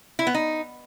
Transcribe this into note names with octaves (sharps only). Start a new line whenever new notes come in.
E4
B3
D#4